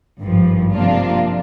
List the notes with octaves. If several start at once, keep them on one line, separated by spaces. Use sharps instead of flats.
G#1 G2 F3
C3 F3 A#3 D4 F4